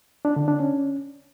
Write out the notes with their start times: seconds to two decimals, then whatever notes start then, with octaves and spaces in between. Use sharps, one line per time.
0.25 D4
0.36 D3
0.48 D4
0.60 C#4